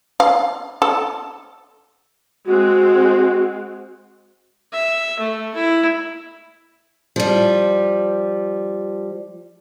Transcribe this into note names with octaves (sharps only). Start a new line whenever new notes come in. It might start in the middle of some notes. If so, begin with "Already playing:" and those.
F5
A4
G#3 C4 F#4
E5
A3
E4
F3 G3